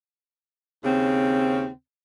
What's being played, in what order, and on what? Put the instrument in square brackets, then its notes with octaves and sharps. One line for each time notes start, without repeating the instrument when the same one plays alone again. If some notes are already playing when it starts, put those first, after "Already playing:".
[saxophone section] D#2 C#3 C4